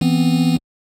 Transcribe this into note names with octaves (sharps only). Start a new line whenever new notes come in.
E3 B3 C4